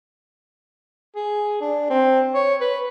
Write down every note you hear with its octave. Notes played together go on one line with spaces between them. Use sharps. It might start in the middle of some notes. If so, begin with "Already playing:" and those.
G#4
D4
C4
C#5
B4